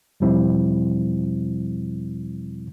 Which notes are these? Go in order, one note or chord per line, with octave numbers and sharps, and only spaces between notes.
E2 B2 F3 G3 C4 E4